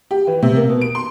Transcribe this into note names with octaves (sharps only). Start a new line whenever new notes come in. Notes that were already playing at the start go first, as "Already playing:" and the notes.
G4
E3
C3
A#3
B2
D7
C6